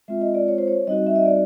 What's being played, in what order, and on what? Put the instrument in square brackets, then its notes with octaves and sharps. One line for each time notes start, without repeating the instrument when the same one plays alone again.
[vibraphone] G#3 C4 F4 E5
D#5
D5
C#5
C5
C#5
G3 C4 D#4 F#4 D#5
E5
D#5
D5